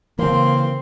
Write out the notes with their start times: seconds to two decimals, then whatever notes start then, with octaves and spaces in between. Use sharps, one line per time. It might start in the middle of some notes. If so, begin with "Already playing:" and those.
0.19 C#3 E3 A#3 C4 C6